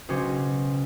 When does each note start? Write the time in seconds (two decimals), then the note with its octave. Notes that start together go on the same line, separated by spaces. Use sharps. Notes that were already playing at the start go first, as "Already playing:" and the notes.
0.08 B1 C#3 C#4 F#4 C5 D6